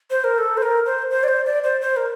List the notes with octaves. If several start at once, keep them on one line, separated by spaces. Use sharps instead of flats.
C5
A#4
A4
C5
A#4
C5
C5
D5
C5
D5
C5
C5
A#4